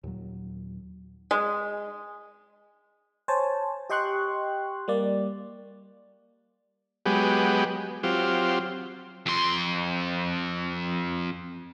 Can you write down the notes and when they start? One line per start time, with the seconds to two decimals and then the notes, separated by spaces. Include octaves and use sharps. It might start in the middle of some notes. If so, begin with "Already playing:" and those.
0.04 D#2 A#2 F#3
1.31 G#3
3.28 C5 C#5 G#5 A5
3.90 G4 D#5 G5 C6 C#6 F#6
4.88 G3 A#3 D5
7.06 F#3 G#3 B3 G4
8.03 F#3 C4 F4 G4
9.26 F2 C6